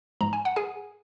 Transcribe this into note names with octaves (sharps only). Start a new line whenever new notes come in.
G#2 F3 G#3 A#5
G#5
F#5
G#4 G#5